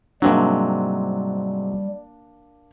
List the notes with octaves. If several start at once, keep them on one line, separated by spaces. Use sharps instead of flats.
G#2 C3 F#3 G3 A#3 D4